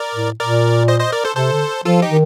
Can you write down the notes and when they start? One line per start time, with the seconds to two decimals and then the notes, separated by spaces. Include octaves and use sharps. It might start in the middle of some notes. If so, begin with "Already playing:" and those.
Already playing: A#4 D5
0.15 A2
0.39 A#2 A#4 D5
0.88 C5 D#5
1.00 C5 D#5
1.12 A#4 D5
1.24 A4 C5
1.36 C3 A4 C5
1.53 D3
1.85 F3 F4 A4
2.02 D#4 G4
2.10 D#3